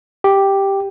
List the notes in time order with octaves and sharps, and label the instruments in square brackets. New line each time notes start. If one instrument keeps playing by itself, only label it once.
[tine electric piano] G4